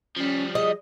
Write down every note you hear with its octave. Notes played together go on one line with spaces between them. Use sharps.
F3 G3 C#4
G#4 D#5